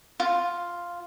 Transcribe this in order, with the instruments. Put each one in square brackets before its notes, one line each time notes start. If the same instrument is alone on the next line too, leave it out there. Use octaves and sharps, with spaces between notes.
[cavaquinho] F4